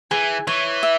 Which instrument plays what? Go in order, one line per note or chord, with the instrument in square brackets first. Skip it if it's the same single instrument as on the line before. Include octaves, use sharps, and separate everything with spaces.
[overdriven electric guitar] E3 [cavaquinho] G#4
[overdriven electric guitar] E3 [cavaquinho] C#5
[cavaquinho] E5